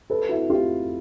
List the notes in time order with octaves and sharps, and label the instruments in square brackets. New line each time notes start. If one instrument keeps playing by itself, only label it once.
[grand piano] A4 B4
E4 F#4
F4 G4